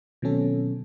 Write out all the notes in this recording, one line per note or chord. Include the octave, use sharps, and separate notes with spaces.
B2 D#3 F#3 C4 C#4 A4